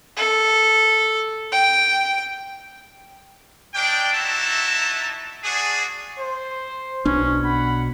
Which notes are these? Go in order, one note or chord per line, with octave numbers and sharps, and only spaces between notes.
A4
G5
G3 G#3 D4 G5
D#4 E4 F#4 E5 A5
D4 F#4 G#4
C5
B1 B2 C#4 D4
F#5 B5